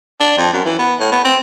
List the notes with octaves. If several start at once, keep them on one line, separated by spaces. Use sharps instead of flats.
D4
F2
F#2
E3
B3
A2
B3
C4